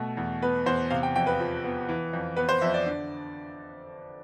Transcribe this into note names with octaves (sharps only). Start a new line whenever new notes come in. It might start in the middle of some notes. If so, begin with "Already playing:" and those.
Already playing: B2 A3
E2
B3 B4
E2 C5
C3 F5
G5
F2 G5
B4
F3
B3
E3
F2
B3 B4
C5
F2 E5
D5
D3